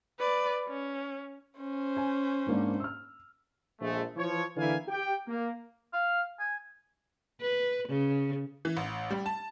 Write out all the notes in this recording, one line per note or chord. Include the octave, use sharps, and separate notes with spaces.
B4 D5
C#4
C#4 C5
G#5
G#2 A#3 D4
E6 F6
A#1 G#3 A3
E3 F3 C#5
D3 E3 A#3 E4 F5 G#5
G4 G5
A#3
F5
G#5
B4
C#3
E3
A1
G3
A5